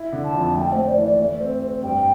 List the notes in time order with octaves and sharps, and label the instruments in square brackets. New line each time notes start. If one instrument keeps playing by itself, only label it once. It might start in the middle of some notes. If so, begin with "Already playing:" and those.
Already playing: [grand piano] E4
D3
[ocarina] A5
[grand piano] F2
[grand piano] A3 [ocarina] G5
[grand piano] A3 [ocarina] C5
[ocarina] D5
[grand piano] E3
[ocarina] D5
[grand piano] A3
C4
C4
[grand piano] G2 [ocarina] G5